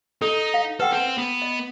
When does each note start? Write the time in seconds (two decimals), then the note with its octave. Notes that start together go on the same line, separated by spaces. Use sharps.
0.22 D#4 A4
0.54 F5
0.80 A4 B4 F#5 G5
0.92 C4
1.18 B3
1.42 D#5